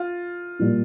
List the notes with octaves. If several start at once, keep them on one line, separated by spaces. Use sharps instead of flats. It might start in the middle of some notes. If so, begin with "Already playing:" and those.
Already playing: F4
A#2 G3 A#3